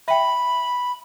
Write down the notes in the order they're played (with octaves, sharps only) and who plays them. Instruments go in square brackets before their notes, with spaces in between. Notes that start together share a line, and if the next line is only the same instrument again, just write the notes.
[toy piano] E5 G5 [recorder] B5